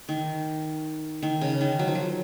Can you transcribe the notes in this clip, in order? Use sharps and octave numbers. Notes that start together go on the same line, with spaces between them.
D#3
D#3
C#3
D#3
F#3
F3
F#3